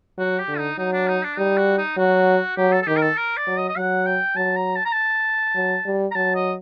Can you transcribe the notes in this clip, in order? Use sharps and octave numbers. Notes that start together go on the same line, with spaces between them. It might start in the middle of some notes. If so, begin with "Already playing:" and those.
F#3 F#4
G4
D3
D#4
F#3 D#4
D4
D#4
D4
G3 D#4
F#4
D#4
F#3 F#4
F#3 G4
A4
A4
D#3 G4
A#4
A4
A#4
D5
F#3
D#5
D#5
F#3 F#5
G5
F#3 A5
A#5
A5
A#5
A5
F#3
G3
A#5
F#3 A5
D#5